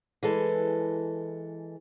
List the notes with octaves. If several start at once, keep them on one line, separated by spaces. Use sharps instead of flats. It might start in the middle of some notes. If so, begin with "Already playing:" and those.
E3 G#3 A4